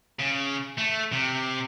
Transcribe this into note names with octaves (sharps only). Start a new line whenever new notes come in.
C#3
A3
C3